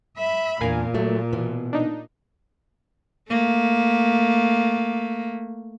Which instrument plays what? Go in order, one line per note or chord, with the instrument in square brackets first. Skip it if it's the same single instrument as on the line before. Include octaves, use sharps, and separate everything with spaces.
[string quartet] E5 B5
[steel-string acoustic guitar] E2 D4 [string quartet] A#2 [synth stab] A#4 F5 G#5
[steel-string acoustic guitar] F#3 A3
B2 E3
[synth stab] D4 D#4
[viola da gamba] A3 A#3